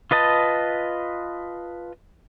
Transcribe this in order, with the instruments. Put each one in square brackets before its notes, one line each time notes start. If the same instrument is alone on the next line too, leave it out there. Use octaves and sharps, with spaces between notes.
[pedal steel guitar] F4 B4 D#5 A5